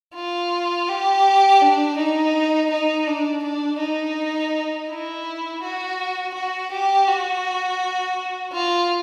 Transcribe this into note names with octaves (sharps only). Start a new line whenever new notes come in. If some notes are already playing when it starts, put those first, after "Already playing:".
F4
G4
D4
D#4
D#4
D4
D4
D#4
E4
F#4
F#4
G4
F#4
F4